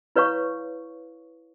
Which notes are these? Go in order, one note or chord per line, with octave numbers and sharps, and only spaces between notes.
E4 B4 C#5 F5 C#6